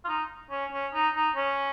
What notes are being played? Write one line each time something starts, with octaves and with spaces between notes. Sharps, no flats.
F4
D#4
C#4
C#4
D#4
D#4
C#4